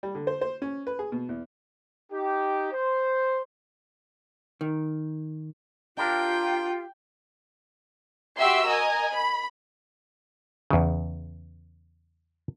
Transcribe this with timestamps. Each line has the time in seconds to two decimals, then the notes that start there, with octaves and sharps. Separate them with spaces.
0.03 G3
0.15 D3
0.27 C5
0.41 C5
0.62 C#4
0.87 B4
0.99 G#4
1.12 B2
1.29 E2
2.12 D#4 G4
2.72 C5
4.61 D#3
5.97 D4 F4 G4 A#4 G5
8.38 F#4 G4 E5 G5 C6 E6
8.66 A#4 D#5 G#5 A#5
9.12 B5
10.70 E2 C#3